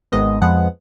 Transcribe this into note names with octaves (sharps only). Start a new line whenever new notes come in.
G#1 G#2 D#3 G#3 B3 D#5
F2 F3 G#3 B3 F#5